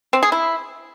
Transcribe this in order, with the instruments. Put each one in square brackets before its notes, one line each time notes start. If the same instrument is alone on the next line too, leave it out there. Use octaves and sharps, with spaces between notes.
[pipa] C4
G#4
E4